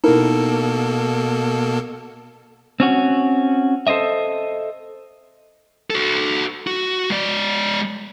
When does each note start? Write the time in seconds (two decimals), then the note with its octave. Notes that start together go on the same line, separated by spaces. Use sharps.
0.04 B2 A#3 D#4 E4 A4 A#4
2.80 C4 C#4 F#4
3.87 A4 C5 C#5 D#5 E5
5.90 F#4 A4
6.67 F#4
7.10 G#3 D5